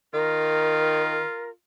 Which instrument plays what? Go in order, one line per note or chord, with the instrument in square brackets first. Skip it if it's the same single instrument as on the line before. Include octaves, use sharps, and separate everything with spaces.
[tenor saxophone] D#3 [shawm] F4 [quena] A#4